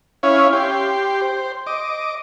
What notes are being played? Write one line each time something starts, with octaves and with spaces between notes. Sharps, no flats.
C#4 E4 C#5 F5
G4 C6
C5
D#5 D6